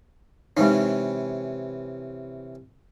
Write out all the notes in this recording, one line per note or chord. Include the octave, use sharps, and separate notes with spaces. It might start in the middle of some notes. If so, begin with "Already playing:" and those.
C3 E3 G#3 C#4 D#4